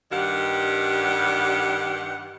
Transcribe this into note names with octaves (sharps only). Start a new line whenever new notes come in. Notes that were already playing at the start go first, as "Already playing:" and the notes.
G2 D#3 G3 G4 F#5